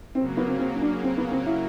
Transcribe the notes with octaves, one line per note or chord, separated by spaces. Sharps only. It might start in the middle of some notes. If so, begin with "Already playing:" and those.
C#3 F#3 A#3 C4
B3
C4
C4
C#4
D4
C4
B3
C4
E4